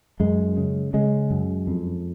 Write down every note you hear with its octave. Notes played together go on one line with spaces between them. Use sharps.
F#2 G#3
C#3
C#3 G#3
F#2
F2